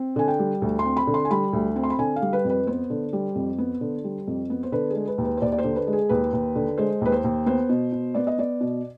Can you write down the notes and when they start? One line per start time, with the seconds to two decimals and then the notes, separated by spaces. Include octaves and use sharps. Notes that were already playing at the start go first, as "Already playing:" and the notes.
Already playing: C4
0.16 D3 G#5
0.28 G5
0.39 G3
0.62 D2
0.79 C6
0.85 C4
0.97 B5
1.07 D3
1.14 C6
1.25 G#5
1.31 G3 B5
1.53 D2
1.76 C4
1.84 C6
1.90 B5
1.99 D3 G#5
2.16 F5
2.22 G3
2.33 B4
2.44 F2
2.50 B4
2.67 B3 C5
2.90 D3
3.13 G3
3.35 F2
3.58 B3
3.81 D3
4.04 G3
4.27 F2
4.50 B3
4.63 C5
4.72 D3 B4
4.90 G#3 G#4
5.08 B4
5.18 D#2
5.24 B4
5.37 C5
5.42 D#2 D5
5.52 D5
5.58 C5
5.64 D3
5.76 B4
5.87 G#3
5.93 G#4
6.09 D#2 B4
6.33 D#2
6.56 D3
6.78 G#3 C5
7.01 D#2 B4
7.12 C5
7.24 D#2
7.46 B3 C5
7.69 B2
7.92 B2
8.14 B3 D5
8.27 D#5
8.38 B3 D5
8.61 B2